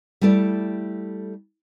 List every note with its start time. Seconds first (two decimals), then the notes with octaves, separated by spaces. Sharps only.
0.21 G3 A3 E4 A4 D5